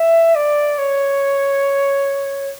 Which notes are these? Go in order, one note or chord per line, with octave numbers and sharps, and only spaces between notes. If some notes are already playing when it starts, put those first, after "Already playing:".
Already playing: E5
D5
C#5